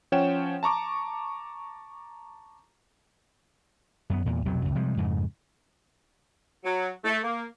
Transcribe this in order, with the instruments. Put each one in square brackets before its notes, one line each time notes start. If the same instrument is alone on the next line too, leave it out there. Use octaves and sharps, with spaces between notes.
[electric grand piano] F3 C#4 C#5 F#5 G5 E7
A5 A#5 C#6 D6
[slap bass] F#2 B3
E2 A#2
B1 F2 C3 F#3
C#2 F#2
C3 F3 G3 G#3
F2 G#2 C#3
[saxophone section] F#3
A3
A#3